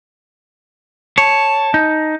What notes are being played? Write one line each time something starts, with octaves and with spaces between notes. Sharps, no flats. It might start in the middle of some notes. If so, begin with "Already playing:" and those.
C#5 A5
D#4